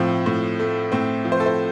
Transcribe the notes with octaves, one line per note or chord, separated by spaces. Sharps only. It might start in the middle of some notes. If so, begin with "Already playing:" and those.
Already playing: A2 F3 C4
A2
A3
A2 C4
F3
C5
A4
C5